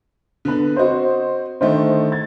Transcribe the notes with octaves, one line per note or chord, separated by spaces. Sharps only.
D3 B3 B4
C4 F#4 C5 D#5
D3 D#3 A3 C5 D#5
G#6 A6